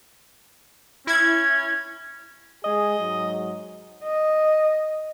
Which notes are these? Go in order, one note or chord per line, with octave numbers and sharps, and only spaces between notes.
C#4 E4 G#6
G#3 G#4 D#5
G#2 F#3
D#5